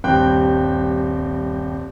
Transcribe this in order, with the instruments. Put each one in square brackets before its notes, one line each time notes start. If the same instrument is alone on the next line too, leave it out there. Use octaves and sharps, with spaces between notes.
[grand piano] D#1 G2 C4 G5 F#6